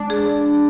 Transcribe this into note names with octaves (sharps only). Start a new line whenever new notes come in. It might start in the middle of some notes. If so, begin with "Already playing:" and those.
Already playing: G#3 D4
G#4